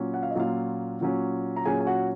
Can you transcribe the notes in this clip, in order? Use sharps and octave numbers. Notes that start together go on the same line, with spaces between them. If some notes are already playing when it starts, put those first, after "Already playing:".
Already playing: A#2 F#3 C#4
F#5
F5
D#5
A#2 F#3 C#4 F4 F5
A#2 F#3 C#4
A#5
A#2 F#3 C#4 G#4 G#5
G#5
F#4 F#5